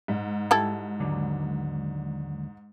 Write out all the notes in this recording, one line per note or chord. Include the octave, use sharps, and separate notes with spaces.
G#2
G3 E4 A4
D#2 D3 F#3